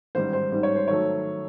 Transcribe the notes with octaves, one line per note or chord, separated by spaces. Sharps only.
A1 G#2 D#3 G3 C5
C5
A1 G#2 D#3 G3
C#5
C5
D#3 F#3 A3 C#5